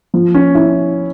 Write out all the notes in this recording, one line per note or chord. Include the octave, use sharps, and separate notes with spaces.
F3
C#4
C#4 E4